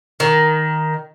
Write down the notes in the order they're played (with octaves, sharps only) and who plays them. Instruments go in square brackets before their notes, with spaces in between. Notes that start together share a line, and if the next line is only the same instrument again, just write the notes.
[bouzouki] D#3